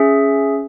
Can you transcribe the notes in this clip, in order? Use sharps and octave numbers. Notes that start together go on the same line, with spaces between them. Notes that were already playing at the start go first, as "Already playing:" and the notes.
Already playing: C#4 G#4 E5